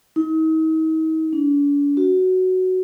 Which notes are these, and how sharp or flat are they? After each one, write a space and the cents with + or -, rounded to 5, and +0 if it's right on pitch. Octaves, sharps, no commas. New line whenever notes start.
D#4 +40
D4 -45
F#4 +5